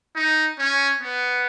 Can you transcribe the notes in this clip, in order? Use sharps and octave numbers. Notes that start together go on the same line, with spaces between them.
D#4
C#4
B3